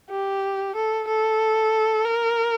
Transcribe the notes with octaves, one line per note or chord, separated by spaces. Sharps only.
G4
A4
A4
A#4